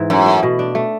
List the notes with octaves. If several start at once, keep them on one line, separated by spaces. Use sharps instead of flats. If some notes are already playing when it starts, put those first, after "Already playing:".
Already playing: G#2 E3
F#2 A3
A3
B2
D4
A3